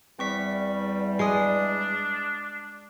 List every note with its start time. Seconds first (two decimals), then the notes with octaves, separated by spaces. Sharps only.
0.19 E2 G3 C4 C#6 B6
1.19 G#3 D4 D#6 C7